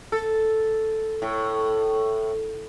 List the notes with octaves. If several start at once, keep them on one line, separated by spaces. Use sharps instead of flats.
A4
A2